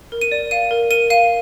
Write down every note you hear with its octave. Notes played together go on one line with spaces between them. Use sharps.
A#4
D#7
D5
F5 D#7
A#4
A#4 D#7
F5 D#7